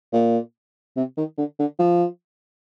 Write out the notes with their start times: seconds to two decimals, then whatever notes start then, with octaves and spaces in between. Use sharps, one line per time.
0.13 A#2
0.97 C3
1.17 D#3
1.38 D3
1.59 D3
1.79 F3